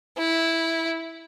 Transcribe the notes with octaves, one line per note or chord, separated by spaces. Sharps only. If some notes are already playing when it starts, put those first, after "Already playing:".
E4